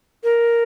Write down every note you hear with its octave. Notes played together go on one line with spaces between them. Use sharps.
A#4